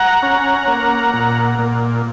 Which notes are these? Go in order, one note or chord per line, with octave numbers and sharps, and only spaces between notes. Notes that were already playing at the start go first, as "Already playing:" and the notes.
Already playing: F#5 A#5
C#4
A#3
A#2
A#2